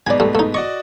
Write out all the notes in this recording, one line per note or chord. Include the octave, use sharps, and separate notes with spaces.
G#2 B2 B4 D5 G#5
G3 A3
A3 D#4
F#4 D5 D#5 C#6